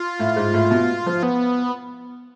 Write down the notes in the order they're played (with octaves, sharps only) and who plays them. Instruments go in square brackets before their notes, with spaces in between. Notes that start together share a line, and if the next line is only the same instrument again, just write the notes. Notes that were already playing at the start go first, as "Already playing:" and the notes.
Already playing: [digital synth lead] F4
[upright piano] A2
G#2
A2
A2
B2
F3
[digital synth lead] B3